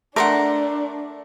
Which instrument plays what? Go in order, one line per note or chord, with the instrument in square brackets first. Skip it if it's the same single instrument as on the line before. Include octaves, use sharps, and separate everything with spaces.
[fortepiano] A3 [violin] D4 [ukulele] A#4 [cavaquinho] F#5 C6 D6